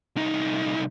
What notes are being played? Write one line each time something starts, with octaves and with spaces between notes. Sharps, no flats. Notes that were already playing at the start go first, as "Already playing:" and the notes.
C2 D#4